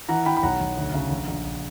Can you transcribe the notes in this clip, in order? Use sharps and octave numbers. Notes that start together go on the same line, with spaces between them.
E3 F#5 A#5
E3 G5 B5
B5
B1 F#5 A#5
B1
D2
C#3
A#1
A#1